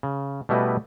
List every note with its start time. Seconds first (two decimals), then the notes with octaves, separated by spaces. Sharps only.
0.03 C#3
0.49 B2 G3 A3 E4 B4 D#5